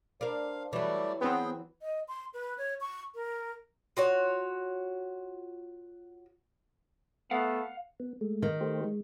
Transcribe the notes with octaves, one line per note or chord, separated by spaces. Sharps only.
D4 A#4 C5 F5
E3 F#3 G3 A3 C#5 D5
B3 C4 G#4 G5
D#5
C6
B4
C#5
C#6
A#4
F4 F#4 C#5
A3 B3 F5 F#5
B3
G#3 A3
D#3
A3 G4 C5
G#3